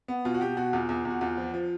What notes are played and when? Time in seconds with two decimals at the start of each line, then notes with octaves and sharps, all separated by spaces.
0.08 B3
0.25 B2 F4
0.34 F#4
0.41 B2 G4
0.57 B2 F#4
0.73 E2 F4
0.89 E2
1.05 E2
1.10 F#4
1.21 E2 F4
1.38 F3
1.54 F3